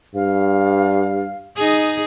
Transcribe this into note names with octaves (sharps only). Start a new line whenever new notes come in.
G2 F5
D#4 G#4